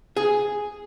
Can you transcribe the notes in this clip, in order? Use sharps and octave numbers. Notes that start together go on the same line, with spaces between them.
G#4